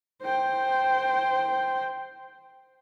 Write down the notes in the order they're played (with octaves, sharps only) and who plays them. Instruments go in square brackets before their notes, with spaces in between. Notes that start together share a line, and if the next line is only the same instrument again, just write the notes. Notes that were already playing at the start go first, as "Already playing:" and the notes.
[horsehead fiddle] C5 G5